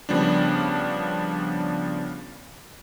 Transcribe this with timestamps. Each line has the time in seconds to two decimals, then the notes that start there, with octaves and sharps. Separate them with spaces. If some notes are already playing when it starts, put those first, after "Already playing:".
0.09 C#3 F3 G3 B3 D4